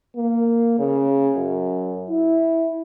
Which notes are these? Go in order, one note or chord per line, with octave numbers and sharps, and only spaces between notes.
A#3
C#3
F#2
E4